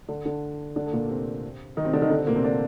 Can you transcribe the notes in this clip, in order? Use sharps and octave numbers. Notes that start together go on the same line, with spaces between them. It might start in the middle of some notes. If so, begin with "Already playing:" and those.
D3 D4
D3 D4
D3 D4
A3
A#2 A#3
C3 C4
D#3 D#4
C3 C4
D3 D4
D#3 D#4
D3 D4
C3 C4
A#2 A#3
C3 C4
D3 D4